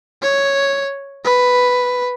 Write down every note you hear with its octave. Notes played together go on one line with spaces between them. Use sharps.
C#5
B4